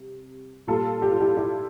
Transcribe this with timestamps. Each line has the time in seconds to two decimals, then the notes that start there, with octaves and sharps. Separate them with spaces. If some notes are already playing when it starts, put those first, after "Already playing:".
Already playing: C3 G3
0.67 A#2 G3 F4 A4
1.02 G4
1.12 F4
1.21 E4 G4
1.37 E4 G4